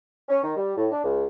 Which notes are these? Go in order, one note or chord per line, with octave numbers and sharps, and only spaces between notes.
C#4
D#3
G3
A2
D4
C#2